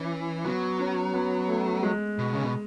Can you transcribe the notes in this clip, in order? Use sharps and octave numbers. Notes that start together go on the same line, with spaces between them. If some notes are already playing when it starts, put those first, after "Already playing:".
Already playing: E3 C#4
F#3 B3
C#4
B3
A3
G#3
B2
C#3
B2